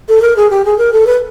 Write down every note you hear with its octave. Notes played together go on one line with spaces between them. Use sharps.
A4
A#4
G#4
G4
G#4
A#4
A4
B4